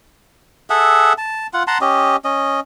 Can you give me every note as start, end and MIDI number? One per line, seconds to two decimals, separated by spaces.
0.70 1.13 68
0.70 1.13 69
0.70 1.13 76
0.70 1.13 78
1.18 1.47 81
1.54 1.63 65
1.54 1.63 78
1.67 1.78 78
1.67 1.78 81
1.67 1.78 82
1.67 1.78 84
1.81 2.16 61
1.81 2.16 67
1.81 2.16 75
2.25 2.60 61
2.25 2.60 75